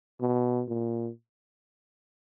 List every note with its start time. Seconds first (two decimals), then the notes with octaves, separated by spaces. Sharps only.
0.21 B2
0.68 A#2